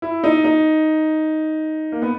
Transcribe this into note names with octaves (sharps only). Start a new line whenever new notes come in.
E4
D#4
D#4
A#3
B3